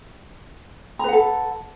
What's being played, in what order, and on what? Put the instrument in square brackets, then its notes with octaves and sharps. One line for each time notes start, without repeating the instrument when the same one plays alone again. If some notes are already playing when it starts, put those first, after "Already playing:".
[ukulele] A#5
B4
F#5
A4